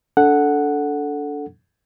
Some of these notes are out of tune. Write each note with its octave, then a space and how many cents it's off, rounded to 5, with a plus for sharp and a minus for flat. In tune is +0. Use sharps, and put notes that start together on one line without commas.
D4 -30 A4 +0 F#5 +0